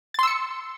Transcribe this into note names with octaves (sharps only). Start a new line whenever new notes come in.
C6 E6 A6 C#7